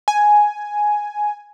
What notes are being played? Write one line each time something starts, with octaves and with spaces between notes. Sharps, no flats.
G#5